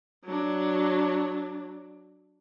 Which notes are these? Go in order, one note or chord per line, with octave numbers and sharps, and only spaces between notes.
F#3 D4